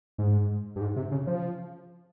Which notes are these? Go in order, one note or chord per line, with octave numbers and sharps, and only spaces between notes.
G#2
G2
G#2
C3
C#3
F3